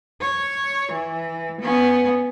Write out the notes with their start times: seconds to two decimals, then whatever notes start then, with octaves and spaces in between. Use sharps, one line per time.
0.21 C#5
0.92 E3
1.61 B3 C#4